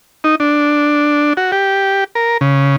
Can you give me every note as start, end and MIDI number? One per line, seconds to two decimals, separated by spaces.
0.24 0.35 63
0.40 1.33 62
1.37 1.51 66
1.52 2.04 67
2.15 2.37 70
2.41 2.76 49